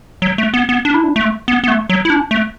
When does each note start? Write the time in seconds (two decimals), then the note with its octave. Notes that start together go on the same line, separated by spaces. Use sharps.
0.22 F#3
0.38 A3
0.54 B3
0.69 B3
0.85 D4
0.94 E4
1.04 D4
1.16 A3
1.48 B3
1.64 B3
1.68 A3
1.90 F#3
2.05 E4
2.10 D4
2.31 A3